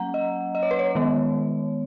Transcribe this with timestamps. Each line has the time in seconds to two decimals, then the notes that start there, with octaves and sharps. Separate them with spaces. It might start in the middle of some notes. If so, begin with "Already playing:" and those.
Already playing: F#3 A#3 C#4 F#5 A#5
0.14 D#5
0.55 D#5
0.63 C#5
0.71 B4
0.79 C#5
0.95 D#3 G#3 B3